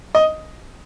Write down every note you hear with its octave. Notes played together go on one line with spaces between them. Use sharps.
D#5